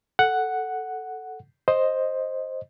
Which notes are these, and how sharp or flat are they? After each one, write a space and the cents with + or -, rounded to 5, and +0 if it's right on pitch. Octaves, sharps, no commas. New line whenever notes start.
A4 +0 F#5 +0
C5 +10 D#5 +0